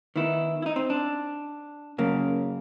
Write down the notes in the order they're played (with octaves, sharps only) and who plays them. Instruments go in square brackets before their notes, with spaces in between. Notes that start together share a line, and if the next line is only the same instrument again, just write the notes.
[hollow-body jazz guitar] D#3 B3 E4
D#4 E4
C4
D4
F#2 C#3 A#3